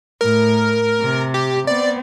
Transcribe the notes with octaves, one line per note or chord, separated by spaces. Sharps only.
A2 A#4
C3
G4
B3 C4 D5